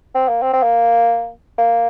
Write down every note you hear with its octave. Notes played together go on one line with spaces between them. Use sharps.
C4
A#3
C4
C4
A#3
A#3